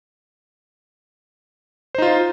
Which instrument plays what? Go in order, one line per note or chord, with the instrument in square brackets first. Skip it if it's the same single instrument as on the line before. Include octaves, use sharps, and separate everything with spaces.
[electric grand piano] C5
D#4
F4